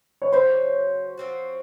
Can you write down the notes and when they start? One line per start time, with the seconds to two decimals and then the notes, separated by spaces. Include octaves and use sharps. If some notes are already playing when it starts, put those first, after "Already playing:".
0.22 C#5
0.32 C#3 F#3 C#4 F#4 C5
1.18 F3 C4 F#4